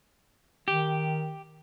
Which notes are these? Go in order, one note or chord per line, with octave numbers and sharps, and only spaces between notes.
D#3 G4